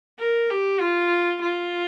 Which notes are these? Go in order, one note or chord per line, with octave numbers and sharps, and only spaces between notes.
A#4
G4
F4
F4